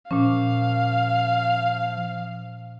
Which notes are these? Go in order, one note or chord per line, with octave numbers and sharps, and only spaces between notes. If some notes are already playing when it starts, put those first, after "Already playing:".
A#2 F3 C#4 F5